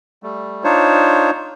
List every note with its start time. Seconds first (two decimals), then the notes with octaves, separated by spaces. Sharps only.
0.23 G3 A3
0.64 D4 D#4 F4 C5 C#5